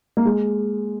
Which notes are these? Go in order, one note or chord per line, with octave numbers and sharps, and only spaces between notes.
A#3
G#3